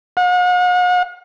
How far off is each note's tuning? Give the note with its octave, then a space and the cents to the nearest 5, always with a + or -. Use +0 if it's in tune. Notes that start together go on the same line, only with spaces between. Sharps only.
F#5 -45